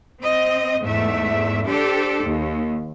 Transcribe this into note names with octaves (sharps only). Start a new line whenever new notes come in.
C4 D#5
E2 G#2 A3 E5
D4 G4 A4 C5
D#2